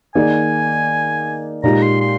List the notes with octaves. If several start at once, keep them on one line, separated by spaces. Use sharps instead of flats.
D#3 A#3 D#4 G#4 D5 G#5
A#2 G#3 D#4 G4 A#5
C6
C6